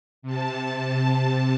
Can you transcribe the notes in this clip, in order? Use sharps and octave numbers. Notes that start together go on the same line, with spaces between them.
C3 A5